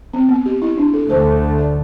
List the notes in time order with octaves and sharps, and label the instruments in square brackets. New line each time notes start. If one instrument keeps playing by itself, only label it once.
[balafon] C4
B3
G4
E4
D4
A4
[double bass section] D2 D3 A3 [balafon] C5
[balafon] D5